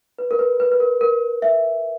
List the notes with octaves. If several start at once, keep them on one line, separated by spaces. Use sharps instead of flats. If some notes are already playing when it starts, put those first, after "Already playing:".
B4
A#4
B4
B4
B4
A#4
A#4
E5